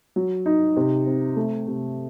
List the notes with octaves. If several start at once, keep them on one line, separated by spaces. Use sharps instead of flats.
F#3
D#4
C3
C4
A3
C3